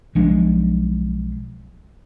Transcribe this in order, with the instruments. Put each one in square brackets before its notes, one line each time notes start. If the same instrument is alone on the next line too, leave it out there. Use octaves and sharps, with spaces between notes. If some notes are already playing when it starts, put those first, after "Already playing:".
[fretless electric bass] B1 F3 G#3 D4